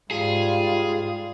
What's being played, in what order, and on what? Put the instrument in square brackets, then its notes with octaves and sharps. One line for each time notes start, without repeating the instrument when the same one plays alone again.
[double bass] G#2 [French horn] G3 [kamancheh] F4 [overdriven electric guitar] G#4